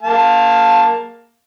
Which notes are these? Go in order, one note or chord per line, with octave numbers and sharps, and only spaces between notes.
A#3 F5 A5